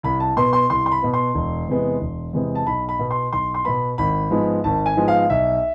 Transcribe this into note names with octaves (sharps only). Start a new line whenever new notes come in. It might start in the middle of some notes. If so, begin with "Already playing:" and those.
C2 B5
A5
B2 B3 C6
C6
C2 C6
C6
B5
B2 B3
C6
E1
E2 C3 G#3 B3
E1
E2 C3 G#3 B3
A5
B1 B5
B5
B2 B3
C6
B1 C6
C6
B2 B3 B5
G#1 B5
G#2 F3 G#3 B3
G#1 A5
G#5
G#2 F3 G#3 B3
F5
B1 E5